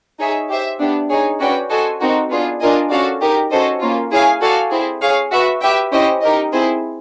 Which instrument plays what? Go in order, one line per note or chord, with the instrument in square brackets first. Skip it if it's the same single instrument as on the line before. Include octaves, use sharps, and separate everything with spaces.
[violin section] D#4 G#4 C#5 E5
G4 C5 E5
B3 D4 G4
D#4 G#4 C#5
C#4 F#4 B4 D5 G5
F#4 A4 C5 D#5 G#5
C4 D#4 F#4 A#4
B3 D4 F4 G#4
D4 F4 A#4 D#5 G#5
C#4 F#4 A4 D5 F5
D#4 G4 A#4
C#4 F#4 A4 C5 D#5
A#3 C#4 F4
E4 G#4 C#5 F5 G#5
F#4 A4 D5 F5 G#5
C4 E4 G#4
G#4 C#5 F5
F#4 B4 E5
G4 B4 E5 G5
C#4 E4 G4 C5 D#5
D#4 G4 A#4 D#5
C4 E4 G#4 C5